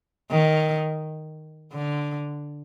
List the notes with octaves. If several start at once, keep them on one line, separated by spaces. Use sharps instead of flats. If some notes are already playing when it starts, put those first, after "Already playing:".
D#3
D3